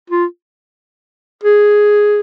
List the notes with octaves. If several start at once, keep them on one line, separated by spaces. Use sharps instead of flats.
F4
G#4